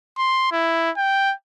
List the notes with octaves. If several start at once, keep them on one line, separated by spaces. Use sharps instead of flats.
C6
E4
G5